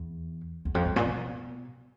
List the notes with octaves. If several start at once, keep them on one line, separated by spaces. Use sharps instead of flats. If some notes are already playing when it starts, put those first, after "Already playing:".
Already playing: E2
E2
F2
G2
A#2
B2